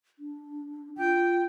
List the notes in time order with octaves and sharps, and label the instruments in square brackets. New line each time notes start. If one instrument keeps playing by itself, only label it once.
[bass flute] D4
[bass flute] F4 [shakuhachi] G5